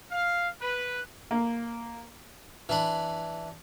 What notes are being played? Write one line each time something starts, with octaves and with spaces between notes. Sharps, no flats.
F5
B4
A#3
E3 D4 B5